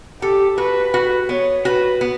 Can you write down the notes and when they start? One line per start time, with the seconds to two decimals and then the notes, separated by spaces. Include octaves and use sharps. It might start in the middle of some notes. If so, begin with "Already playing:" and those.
0.21 G4 A4
0.58 F#4 B4
0.94 F#4
1.29 B3 C#5
1.65 F#4 B4
2.01 B3